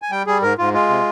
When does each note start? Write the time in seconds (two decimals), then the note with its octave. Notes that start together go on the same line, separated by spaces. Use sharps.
0.02 G#5
0.11 G3 G5
0.27 G3 G#4
0.42 G#2 A#4
0.58 G#2 F4
0.74 G#3 F4
0.89 C3